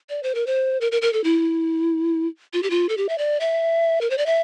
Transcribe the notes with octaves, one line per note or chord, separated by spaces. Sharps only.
D5
C5
A#4
C5
A#4
A#4
A#4
A4
E4
F4
G4
F4
A4
G4
E5
D5
E5
A#4
C5
D5
E5